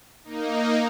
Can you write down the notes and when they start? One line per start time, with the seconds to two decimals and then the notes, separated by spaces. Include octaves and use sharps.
0.24 A#3 D#4